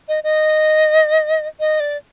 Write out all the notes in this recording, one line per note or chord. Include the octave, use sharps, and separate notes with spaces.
D#5
D#5
D#5
D5